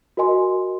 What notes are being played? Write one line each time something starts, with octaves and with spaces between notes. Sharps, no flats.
F#4 A#4 D#5 G#5 C6